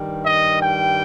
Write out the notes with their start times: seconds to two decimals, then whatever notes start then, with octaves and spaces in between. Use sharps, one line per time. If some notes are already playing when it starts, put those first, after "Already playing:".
Already playing: G2 D#3 G3
0.26 D#5
0.63 G5